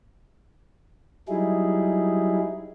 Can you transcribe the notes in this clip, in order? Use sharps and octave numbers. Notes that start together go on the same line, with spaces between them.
F#3 G3 D#4 E4 G#4